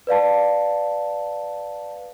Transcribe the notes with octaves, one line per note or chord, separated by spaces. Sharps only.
B4 D5 F5 A5